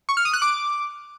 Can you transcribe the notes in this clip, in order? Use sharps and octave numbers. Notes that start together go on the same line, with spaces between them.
C#6
F6
D#6
F#6
D6